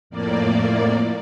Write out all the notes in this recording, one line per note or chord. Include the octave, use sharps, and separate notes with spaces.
F2 A2 A#3 D5